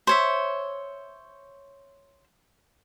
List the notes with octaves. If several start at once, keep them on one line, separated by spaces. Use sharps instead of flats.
C5 C#5 E5